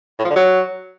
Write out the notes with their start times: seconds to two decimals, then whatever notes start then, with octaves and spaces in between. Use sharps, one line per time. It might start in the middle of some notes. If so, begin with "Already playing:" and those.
0.19 A2
0.25 F3
0.30 D3
0.36 F#3